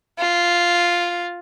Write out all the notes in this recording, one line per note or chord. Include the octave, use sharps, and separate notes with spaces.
F4